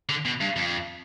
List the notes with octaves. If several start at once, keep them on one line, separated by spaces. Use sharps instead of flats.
D3
B2
G2
F2